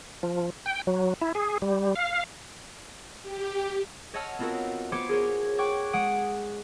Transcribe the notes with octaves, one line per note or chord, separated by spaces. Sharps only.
F3
G5
F#3
E4
G#4
G3
F5
G4
C#5 D#5 F#5 A5 E6 F6
B3 C4 F4 F#4 A#4
B3 C5 C6 D6 G#6 C#7
G#4 A#4 C5 C#5
G5 C#6 D6 F#6 G#6
G#3 F#5 D#6 D7